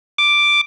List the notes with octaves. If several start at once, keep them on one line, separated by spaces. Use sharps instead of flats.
D6